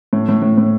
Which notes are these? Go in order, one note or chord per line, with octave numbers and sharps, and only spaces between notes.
A2
A2
A2
A2